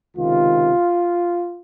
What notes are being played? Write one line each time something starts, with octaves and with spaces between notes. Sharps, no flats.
C#2 C3 D#3 F4